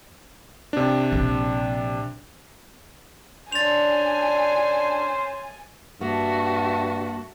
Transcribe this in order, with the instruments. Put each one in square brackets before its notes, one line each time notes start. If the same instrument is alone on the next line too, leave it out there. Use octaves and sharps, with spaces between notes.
[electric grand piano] C3 D4
[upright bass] A#1
[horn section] C#4 C5 C6 [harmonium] D4 [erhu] G#5 [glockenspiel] A6 F7
[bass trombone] G2 [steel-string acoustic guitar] A#3 [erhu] F#4 [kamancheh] E5 A5